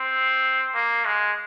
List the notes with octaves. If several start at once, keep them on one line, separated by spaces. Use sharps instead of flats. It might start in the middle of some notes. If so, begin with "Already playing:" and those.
Already playing: C4
A#3
G#3